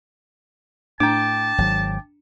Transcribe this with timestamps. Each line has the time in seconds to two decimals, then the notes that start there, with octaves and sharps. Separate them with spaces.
1.00 A2 D4 G5 A5 A#5 D6
1.58 G#1 F#3